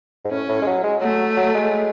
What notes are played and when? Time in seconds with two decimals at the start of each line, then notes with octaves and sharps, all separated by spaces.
0.25 G#2
0.31 A2 C#4
0.49 A2
0.62 G#3
0.67 F#3
0.84 G#3
1.01 F#3 A3
1.37 F#3
1.55 G#3